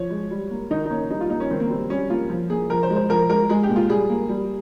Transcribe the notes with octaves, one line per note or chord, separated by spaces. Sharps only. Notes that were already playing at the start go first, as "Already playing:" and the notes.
Already playing: F3 C#5
G#3
G3
A#3
D#3 D#4
D#4
A#3 C#4
G3 D#4
F4
A#3 D#4
C#4
D#3 C4
A#3
G3 C4
G3 C#4
A#3 F4
F3
A#3 G#4
F3 A#4
C5
G#3
C5
F3 A#4
G#3 A#4
G#3 G#4
G4
A#2
F4
G3 G#4
A#3
G3